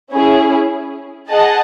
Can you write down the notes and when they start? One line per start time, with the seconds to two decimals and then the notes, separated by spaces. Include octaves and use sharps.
0.12 C#4 E4 G#4
1.29 G#4 D#5 F#5 A5